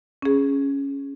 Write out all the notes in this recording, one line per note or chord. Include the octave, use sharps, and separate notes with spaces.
C#4 G#4